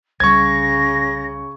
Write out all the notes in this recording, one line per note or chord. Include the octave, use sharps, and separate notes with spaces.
C2 C#3 G3 C#6 G#6 A#6